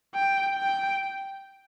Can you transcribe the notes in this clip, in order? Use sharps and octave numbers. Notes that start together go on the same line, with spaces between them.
G5
G5